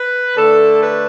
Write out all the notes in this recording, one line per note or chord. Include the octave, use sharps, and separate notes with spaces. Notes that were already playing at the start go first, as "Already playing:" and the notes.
Already playing: B4
D3 A3 D4 A4
B4